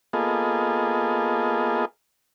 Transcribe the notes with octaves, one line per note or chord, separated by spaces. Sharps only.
A#3 B3 F4 G#4 A4 D#5